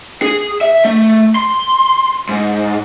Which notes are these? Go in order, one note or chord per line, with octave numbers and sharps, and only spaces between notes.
G#4
E5
A3
C6
G#2